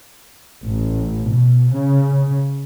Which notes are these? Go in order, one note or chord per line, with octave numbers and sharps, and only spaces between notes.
A1
B2
C#3